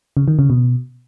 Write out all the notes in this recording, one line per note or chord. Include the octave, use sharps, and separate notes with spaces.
C#3
D#3
C#3
B2